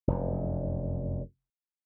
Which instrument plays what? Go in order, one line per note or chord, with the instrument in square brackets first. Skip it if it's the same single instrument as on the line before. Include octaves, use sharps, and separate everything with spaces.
[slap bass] F1 F#2